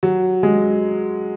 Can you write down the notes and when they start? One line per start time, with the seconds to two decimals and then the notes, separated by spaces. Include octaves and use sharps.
0.03 F#3
0.43 G#3